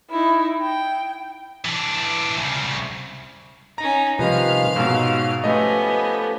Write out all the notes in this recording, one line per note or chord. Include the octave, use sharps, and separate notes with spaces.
D#4 E4
G5
E3 D4
C2 C#3
C#4 D#4 A#5 A#6
C3 D#3 F3 G3 G#3 B4 F5 F6
G#2 B2 C#5 E6
F3 A3 B3 C#4 G4 A4 D#5